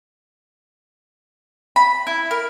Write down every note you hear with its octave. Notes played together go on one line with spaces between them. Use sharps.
B5
E4
A#4